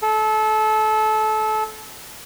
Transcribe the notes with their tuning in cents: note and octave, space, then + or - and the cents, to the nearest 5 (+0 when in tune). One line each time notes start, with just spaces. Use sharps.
A4 -25